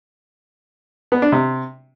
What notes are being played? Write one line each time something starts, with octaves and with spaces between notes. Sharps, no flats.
B3
D4
C3